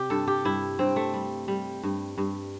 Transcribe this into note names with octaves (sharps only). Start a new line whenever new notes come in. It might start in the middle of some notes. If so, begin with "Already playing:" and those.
Already playing: C3 G4
G2 A4
G4
G2 E4
G2 C4
A3
G3
G3
G2
G2